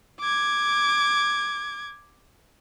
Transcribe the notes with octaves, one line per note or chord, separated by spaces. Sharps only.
D6 G#6